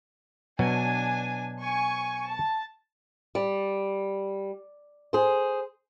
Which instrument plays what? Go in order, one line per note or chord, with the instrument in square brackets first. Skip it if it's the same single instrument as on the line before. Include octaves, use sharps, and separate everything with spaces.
[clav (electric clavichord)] B2 F#3 [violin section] D4 G#5
[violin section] G#5 C#6
A5
[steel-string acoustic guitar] G3
G#4 C5